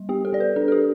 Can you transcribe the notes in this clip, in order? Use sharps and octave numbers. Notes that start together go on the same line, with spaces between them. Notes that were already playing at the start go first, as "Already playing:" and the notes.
Already playing: G3
B3 G4
A4
B3 D5
B4
D4 A4
A4
G4